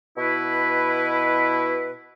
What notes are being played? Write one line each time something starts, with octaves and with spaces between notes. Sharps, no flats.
B2 E4 B4